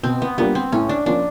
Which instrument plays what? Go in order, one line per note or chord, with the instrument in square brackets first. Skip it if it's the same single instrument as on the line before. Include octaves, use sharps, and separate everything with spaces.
[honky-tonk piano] B2 [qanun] C4
[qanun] B3
[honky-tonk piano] G3 A#3 D4 F4 [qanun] B3
[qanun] C4
[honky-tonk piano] A2 [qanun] C#4
[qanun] D4
[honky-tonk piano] F3 A#3 C#4 F4 [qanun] D4